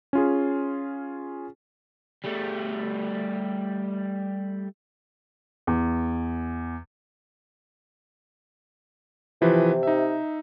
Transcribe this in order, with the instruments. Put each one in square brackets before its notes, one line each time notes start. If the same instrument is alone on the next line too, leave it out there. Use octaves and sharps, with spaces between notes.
[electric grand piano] C#4 F4 G#4
[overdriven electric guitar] G3 A3
[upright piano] E2
[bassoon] C3 [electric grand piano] E3 F3 B4
[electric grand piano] D#4 E5